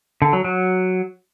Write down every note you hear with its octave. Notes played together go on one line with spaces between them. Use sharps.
D3
F#3
F#3